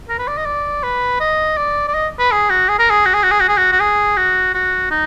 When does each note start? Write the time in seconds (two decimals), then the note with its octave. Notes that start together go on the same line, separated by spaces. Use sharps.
0.09 A#4
0.19 B4
0.28 D5
0.37 D#5
0.46 D5
0.83 B4
1.20 D#5
1.57 D5
1.88 D5
1.94 D#5
2.19 B4
2.32 G#4
2.50 F#4
2.69 G#4
2.79 A#4
2.90 G#4
3.06 F#4
3.14 G#4
3.23 F#4
3.31 G#4
3.40 F#4
3.49 G#4
3.57 F#4
3.72 F#4
3.80 G#4
4.17 F#4
4.54 F#4
4.91 D#4